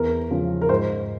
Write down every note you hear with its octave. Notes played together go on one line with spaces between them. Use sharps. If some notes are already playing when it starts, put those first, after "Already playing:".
Already playing: E2 A#4
C#3 F3
A#4
G#2 C5